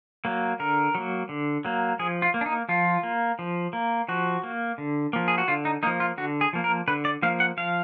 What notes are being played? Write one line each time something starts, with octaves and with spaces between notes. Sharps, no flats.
F#3 A#3
D3 A#4
F#3 A#3
D3
F#3 A#3
F3 G#4
F4
A#3
D4
D#4
F3 F4
A#3
F3
A#3
F3 F#4
A#3
D3
F3 A#3
G#4
F#4
D3 F4
D#4
F3 A#3 D#4
F4
D3 F#4
G#4
F3 A#3
A#4
D3 B4
D5
F3 A#3 F5
F#5
F3 F5